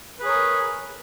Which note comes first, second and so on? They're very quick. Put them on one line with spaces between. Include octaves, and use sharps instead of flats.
B4 G#4 C#5 A#4